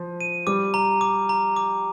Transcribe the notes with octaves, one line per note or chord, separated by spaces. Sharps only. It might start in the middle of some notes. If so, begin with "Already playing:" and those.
Already playing: F3
D#7
G3 D6
A#5
D6
A#5
D6